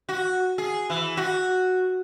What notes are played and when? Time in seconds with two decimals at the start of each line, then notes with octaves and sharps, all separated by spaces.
0.09 F#4
0.58 G#4
0.90 E3
1.17 F#4